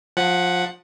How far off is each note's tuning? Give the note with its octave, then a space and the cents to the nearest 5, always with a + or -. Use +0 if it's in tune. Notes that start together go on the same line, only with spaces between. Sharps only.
F3 +25 F#5 +0